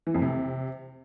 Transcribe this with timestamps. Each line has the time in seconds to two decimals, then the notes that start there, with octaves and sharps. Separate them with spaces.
0.07 E3
0.14 F2
0.22 C3